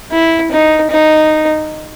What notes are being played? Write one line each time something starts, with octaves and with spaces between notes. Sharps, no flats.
E4
D#4
D#4